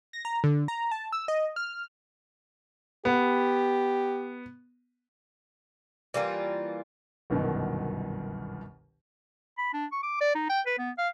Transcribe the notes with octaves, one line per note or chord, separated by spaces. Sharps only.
A#6
A#5
D3
A#5
A5
E6
D#5
F6
B3 G4
E3 G3 A#3 F4
G1 C2 F#2 B2 D#3
B5
D4
C#6
D6
D5
D#4
G5
B4
B3
F5